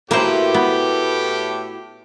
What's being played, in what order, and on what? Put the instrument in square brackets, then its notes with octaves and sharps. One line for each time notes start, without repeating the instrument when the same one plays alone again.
[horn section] A2 G4 [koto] A#3 C5 [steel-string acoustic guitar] E4 F#4 B4
[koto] B3